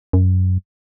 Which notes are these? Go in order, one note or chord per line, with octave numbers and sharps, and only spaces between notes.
F#2